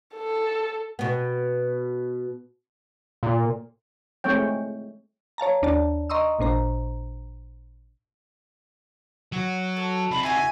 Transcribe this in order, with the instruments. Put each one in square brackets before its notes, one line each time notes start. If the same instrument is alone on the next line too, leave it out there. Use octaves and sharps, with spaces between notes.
[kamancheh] A4
[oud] B2 B3
[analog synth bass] A#2
[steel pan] G#3 A3 C4 C#5 G5
[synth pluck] C#5 F5 A5 A#5
D#2 D4 D5 A5
D#5 A#5 C6 C#6 D#6 E6
A1 A#2 D4 C5 A#5
[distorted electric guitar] F#3 F#4
[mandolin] A4
[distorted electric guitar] C#2 C4 [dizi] B5
[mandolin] F#4 E5 [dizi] G#5